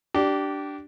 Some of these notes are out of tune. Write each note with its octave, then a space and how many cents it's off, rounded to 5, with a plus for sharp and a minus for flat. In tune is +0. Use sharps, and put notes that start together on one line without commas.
D4 +0 G4 -20